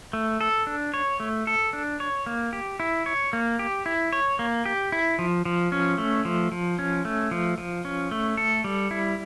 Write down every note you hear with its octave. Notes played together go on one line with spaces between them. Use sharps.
A3
A4
D4
C#5
A3
A4
D4
C#5
A#3
G4
E4
C#5
A#3
G4
E4
C#5
A#3
G4
E4
F3
F3
C#4
A3
F3
F3
C#4
A3
F3
F3
C#4
A3
A4
G3
E4